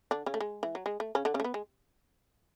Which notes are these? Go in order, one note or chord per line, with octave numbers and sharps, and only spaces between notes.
D3 D4
C#3 C#4
A3
G#3
E3
F#3
G#3
A3
C#3 C#4
D3 D4
C#3 C#4
A3
B3
G#3